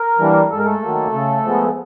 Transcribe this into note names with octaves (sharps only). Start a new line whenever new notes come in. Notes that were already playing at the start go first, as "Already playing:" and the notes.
Already playing: A#4
E3 G3 A#3 D4
G#2 A4
A#4
A3 A4
D#3 F#3 A#3
C#3
F3 G#3 B3